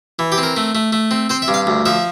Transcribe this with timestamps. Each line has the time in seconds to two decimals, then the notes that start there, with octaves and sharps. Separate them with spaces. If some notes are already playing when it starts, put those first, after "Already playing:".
0.19 E3
0.32 G4
0.38 C4
0.43 A#4
0.56 A3
0.75 A3
0.93 A3
1.11 C4
1.30 C4 C5
1.42 E5
1.48 G2
1.54 F5
1.67 D2
1.86 F3 E5